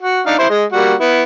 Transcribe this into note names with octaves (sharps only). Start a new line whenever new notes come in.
F#4
D4 D#4 F5
E4 C5 C6
G#3 D#5
G3 A#3 F#4
B3 E4